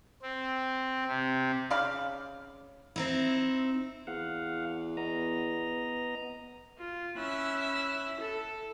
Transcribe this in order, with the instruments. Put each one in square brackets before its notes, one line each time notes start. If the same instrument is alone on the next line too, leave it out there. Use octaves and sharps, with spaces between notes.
[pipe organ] C4
C3
[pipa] C#3 D5 F5 B5
[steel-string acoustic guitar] C4 D#4 E4
[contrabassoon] E2 [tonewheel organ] F5 F#5
[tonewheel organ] B3 D#5 A#5
[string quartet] F4
C#4 E4 E6 F#6
A4